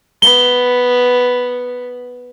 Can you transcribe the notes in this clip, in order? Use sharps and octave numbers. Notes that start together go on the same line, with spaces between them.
B3 G7